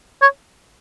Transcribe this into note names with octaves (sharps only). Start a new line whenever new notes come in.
C#5